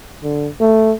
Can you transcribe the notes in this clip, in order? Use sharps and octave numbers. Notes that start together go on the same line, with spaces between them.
D3
A3